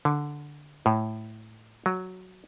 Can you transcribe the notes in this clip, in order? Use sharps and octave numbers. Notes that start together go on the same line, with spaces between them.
D3
A2
F#3